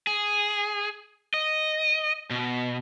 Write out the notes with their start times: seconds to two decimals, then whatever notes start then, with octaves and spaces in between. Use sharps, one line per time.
0.07 G#4
1.34 D#5
2.30 B2